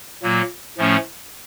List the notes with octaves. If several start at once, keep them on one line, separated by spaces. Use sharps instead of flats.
A#2 F#3 A#3
A2 F3 A3 C#4